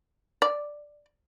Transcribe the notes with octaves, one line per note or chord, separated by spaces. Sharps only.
D5